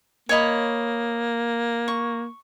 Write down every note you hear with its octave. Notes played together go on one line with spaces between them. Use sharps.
A#3 C#5 D#5 B5
C#6